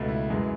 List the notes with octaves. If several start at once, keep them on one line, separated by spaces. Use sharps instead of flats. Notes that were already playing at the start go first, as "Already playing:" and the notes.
Already playing: C#2 B2 A3
E4
F#2 E3 G#3